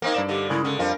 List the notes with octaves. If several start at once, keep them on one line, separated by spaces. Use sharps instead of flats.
A#3 C4 D#4 A#4
G2 D5 E7
D3 G4 D#5
C#3 G#3 E4 A#4
D3 C#4
F2 G3 D4 F4 A#4